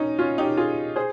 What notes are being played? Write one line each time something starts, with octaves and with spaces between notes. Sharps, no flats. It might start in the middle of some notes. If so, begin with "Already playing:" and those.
Already playing: C#4 D#4
C#4 F4
D#4 G4
F4 G#4
G#4 C5